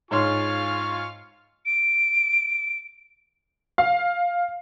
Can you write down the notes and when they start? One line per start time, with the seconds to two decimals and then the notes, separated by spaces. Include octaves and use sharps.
0.11 G#2 F4 C#5 F5 G#5 C6 C#6 F6
1.66 D7
3.78 F5